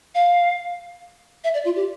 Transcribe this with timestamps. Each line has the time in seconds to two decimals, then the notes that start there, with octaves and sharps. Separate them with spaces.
0.15 F5
1.44 E5
1.54 D5
1.65 F4
1.76 G4